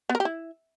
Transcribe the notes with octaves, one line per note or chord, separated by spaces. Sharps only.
B3
A#4
G4
E4